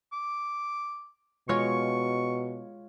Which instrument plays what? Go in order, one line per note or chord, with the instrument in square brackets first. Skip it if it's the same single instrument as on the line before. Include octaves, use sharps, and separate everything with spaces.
[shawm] D6
[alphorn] B2 [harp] G#3 F4 C#5 [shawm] C#6